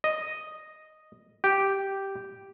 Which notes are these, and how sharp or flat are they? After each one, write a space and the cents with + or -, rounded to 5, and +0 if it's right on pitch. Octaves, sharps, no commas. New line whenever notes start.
D#5 +0
G4 -5